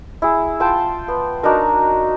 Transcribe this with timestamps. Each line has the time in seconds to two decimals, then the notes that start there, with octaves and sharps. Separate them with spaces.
0.22 E4 G#4
0.60 F4 C5 G5 A5
1.08 B3
1.43 D4 D#4 F#4 A#4